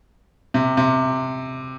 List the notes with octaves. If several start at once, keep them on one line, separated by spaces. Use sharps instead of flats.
C3
C3